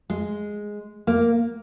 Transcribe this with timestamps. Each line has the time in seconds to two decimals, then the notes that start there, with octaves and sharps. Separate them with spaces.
0.10 G#3
1.07 A#3